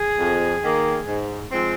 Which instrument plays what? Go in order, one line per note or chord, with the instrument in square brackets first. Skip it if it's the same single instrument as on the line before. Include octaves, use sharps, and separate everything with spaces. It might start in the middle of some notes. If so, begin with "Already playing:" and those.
Already playing: [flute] G#4
[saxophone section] F2
D#3 A#3
G#2
F3 G#3 C4